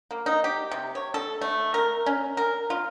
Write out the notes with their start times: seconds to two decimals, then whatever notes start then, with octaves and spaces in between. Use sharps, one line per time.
0.11 A#3
0.26 D#4
0.44 G4
0.71 C3
0.95 C#5
1.14 A4
1.41 A3
1.74 A#4
2.06 C#4
2.37 A#4
2.70 F4